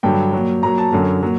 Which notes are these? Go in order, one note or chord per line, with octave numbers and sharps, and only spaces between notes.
G2 D3 F#3 G5
A#2 F#3
A#2 F#3 A#5
A5
F#2 D3 F#3
A#2 F#3